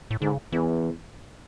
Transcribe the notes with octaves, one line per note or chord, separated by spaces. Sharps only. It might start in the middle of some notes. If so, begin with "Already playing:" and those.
A2
G#2 D3
C#3
E2 E3